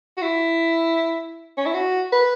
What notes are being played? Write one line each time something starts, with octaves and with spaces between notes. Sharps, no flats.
F#4
E4
C#4
E4
F#4
B4